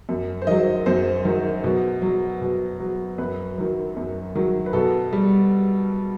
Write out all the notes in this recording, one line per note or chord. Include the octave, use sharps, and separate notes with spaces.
F#2
C5
D#3 F#3 D#5
F#2 C5
D#3 F#3
B2
F#3
B2
F#3
F#2 B4
D#3 F#3
F#2
D#3 F#3
B4
B2 A4
G3